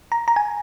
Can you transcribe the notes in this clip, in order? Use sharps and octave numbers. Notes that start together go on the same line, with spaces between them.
A#5
A#5
G#5